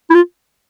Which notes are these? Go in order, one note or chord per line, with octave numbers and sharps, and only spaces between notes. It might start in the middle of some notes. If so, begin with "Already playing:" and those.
E4
F4